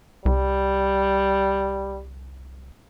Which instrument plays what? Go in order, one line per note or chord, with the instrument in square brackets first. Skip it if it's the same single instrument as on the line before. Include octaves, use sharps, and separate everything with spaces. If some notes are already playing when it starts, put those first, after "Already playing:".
[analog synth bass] C2 [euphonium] G3